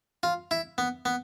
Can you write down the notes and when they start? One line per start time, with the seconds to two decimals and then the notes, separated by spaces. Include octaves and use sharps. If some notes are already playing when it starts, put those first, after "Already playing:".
0.23 F4
0.51 E4
0.78 B3
1.05 B3